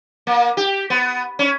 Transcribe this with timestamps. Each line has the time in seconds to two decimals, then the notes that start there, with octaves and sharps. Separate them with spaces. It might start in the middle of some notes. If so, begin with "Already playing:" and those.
0.27 A#3
0.57 G4
0.90 B3
1.39 C#4